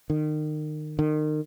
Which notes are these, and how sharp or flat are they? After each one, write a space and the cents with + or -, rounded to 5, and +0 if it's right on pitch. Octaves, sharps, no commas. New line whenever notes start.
D#3 -30
D#3 -30